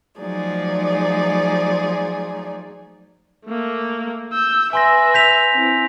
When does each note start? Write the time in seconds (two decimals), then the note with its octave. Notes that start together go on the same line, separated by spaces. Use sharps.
0.18 F3 F#3 A3 D#4 G#4 D5
3.46 A3 A#3
4.33 E6 G6
4.73 B4 E5 G#5 C6 A#6
5.14 G6 B6 F7
5.53 C4 E4